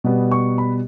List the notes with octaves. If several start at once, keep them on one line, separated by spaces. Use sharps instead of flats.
B2 G3 B3
C#6
B5